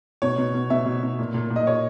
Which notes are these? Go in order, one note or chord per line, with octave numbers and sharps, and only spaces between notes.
B2 C#5
B2
B2
B2 E5
B2
B2
A#2
A#2
A#2
D#5
A#2 C#5